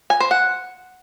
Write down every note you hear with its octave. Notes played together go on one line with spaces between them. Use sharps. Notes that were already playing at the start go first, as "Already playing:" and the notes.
G#5
C5
F#5